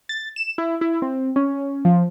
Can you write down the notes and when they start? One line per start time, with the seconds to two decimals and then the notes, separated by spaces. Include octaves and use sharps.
0.09 A6
0.36 E7
0.58 E4
0.81 E4
1.02 C4
1.36 C#4
1.85 F3